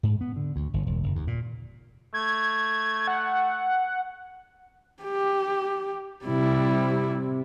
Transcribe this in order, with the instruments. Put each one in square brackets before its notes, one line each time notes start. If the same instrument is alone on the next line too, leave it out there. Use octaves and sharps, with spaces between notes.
[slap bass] G#2
B3
D3
D2
G1
E1
F#1
D#2
A#2
[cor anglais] A3 [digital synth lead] G#6
[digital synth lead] F#5
[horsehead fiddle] G4
[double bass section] C3 [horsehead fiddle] G3 E4